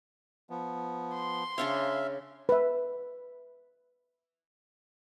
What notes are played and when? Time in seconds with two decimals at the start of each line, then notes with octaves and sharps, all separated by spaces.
0.50 F3 B3
1.14 C6
1.58 C#3 D4 C#5 E5 F5
2.49 B4 E5